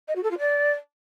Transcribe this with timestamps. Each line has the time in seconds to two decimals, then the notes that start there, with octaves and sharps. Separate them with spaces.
0.07 D#5
0.15 F#4
0.23 A4
0.30 F4
0.38 D5